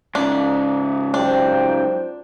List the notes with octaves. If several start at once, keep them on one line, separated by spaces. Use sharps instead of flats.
G#2 C#3 D4
F#3 D4 F4 G4 C5 G5